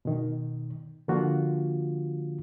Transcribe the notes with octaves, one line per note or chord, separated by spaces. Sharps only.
B2 D#3
D3 F3 A#3 F4 F#4